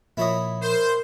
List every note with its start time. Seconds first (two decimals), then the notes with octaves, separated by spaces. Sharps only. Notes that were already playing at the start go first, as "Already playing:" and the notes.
0.17 A#2 F3 E4 C#5 D#5
0.62 A#4 C5